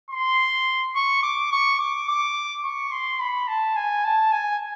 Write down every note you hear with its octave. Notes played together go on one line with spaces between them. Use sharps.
C6
C#6
D6
C#6
D6
D6
C#6
C6
B5
A5
G#5
A5
G#5